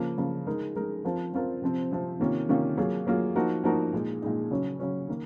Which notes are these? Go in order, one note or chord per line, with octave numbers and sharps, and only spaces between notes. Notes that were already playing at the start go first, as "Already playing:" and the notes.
Already playing: C#3 F3 A#3 F4
C#3 F3 A#3 F4
G#3 D#4 A#4
G#3 D#4 A#4
F3 C4 F4 A#4
F3 C4 F4 A#4
C3 F3 C4
C3 F3 C4
C3 D#3 A#3 C#4 F4
C3 D#3 A#3 C#4 F4
F#3 A#3 F4 G#4
F#3 A#3 F4 G#4
F3 A#3 D#4 F#4 A#4
F3 A#3 D#4 F#4 A#4
A#2 G#3 D#4
A#2 G#3 D#4
C#3 F#3 C#4
C#3 F#3 C#4
D#3 A#3